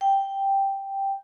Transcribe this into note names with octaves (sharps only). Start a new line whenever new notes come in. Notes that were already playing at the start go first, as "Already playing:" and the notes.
G5